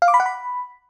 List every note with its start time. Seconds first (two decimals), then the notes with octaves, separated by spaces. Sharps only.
0.02 F5
0.08 D6
0.14 B5
0.20 F#5
0.26 B5